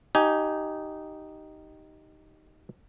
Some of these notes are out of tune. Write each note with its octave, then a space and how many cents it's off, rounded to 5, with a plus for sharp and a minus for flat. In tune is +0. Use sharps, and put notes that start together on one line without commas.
D#4 +0 G4 -15 G#5 +5